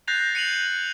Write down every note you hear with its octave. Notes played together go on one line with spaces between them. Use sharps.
F#6 G6 A6 A#6 C7 F7
C#7 D#7 F7 F#7